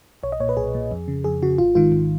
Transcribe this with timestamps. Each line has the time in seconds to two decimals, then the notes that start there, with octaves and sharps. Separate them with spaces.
0.23 B1 C#5
0.32 D#5
0.40 A#2 C#5
0.49 B4
0.57 B1 G#4
0.75 A#2
0.91 F2
1.08 C#3
1.24 F2 G#4
1.42 C#3 F#4
1.58 G#1 F4
1.75 G#2 D#3 F4
1.92 G#1